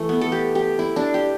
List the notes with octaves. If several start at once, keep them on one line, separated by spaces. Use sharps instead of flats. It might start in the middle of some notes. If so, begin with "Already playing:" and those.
Already playing: E3 A3
B3
A4
G4
G4
E4
D4
G4